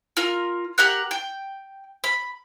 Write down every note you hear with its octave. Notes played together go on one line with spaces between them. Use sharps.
F4 A#4
G4 A#4 F#5 F#6
G5
B5